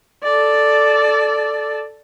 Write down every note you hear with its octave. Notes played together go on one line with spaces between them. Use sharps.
A4 D5